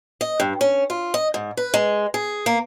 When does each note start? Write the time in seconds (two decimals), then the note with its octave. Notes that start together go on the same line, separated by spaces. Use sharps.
0.21 D#5
0.40 G2
0.61 C#4
0.90 F4
1.14 D#5
1.34 G#2
1.57 B4
1.74 G#3
2.14 G#4
2.46 A#3